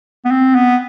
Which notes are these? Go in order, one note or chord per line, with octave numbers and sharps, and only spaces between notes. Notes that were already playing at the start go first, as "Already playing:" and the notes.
B3
C4
B3